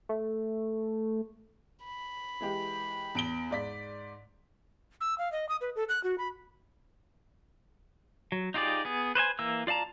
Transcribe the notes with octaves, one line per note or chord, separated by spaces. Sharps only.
A3
B5
E3 G#3 G4
E2 D7 G7
G#2 D5 B6
E6
F5
D#5
D#6
B4
A4
F#6
F#4
B5
F#3
D#4 F4 G4 G#4 D5
B3 G#4
B4 C5 D#5 G#5
E3 A#3 E6
F4 D5 F5 A5 A#5